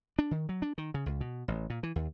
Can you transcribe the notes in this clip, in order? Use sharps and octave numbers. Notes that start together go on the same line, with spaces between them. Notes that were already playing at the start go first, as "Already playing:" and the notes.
D4
D#3
F#3
D4
D#3
C#3
C#2
B2
A1
A#2
E3
D#2